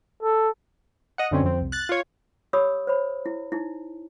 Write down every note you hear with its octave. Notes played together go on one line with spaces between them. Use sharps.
A4
D#5 F#5
F#2 D3 C4 C#4
F2 C4
C2
F#6 A6
F4 C#5
G4 C#5 B5 D#6 E6
C5 C#5 B5
E4
D#4 E4